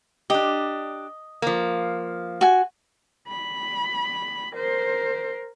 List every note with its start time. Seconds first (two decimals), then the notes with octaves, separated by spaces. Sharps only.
0.30 D4 G4 D#5
1.42 F3 A#3
2.41 F#4 G#5
3.28 B5
4.55 A#4 C5